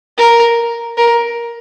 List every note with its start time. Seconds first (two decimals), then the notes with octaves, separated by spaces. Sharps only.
0.18 A#4
0.98 A#4